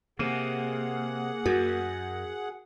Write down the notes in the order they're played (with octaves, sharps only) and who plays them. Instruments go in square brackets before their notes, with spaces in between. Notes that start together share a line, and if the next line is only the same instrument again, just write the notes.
[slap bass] C3 [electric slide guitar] A#3 [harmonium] G#4 F#5
[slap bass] F#2 [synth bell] F#4 A#4